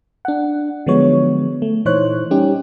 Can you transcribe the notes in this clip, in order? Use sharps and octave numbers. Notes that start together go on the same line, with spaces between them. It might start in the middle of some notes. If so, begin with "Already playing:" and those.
D4 F#5
D3 F3 F#3 G#3 B3 C#5
A3
A#2 E3 D#4 C5 C#5 F#6
G3 C#4 D#4 G4